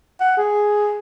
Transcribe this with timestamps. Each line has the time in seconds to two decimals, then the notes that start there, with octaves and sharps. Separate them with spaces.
0.20 F#5
0.37 G#4